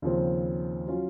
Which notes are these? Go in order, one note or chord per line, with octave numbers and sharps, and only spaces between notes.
D#2 C#3 F3 C4
F#3 C#4 F4